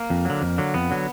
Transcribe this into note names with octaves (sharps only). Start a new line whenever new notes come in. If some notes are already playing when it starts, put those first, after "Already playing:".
Already playing: A#3
F2
D3 F#3
F2
D3 F#3
F2 B3
D3 F#3